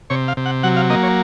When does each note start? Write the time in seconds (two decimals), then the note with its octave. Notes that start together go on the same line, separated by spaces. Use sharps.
0.10 C3 C#5
0.28 F5
0.37 C3
0.46 F#5
0.63 F#3 F#5
0.76 F5
0.90 A#3 D#5
1.03 C#5